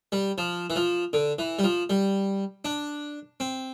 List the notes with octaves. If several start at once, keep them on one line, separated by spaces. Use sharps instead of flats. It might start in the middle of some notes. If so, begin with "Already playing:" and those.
G3
F3
E3
F3
D3
E3
G3
F3
G3
D4
C4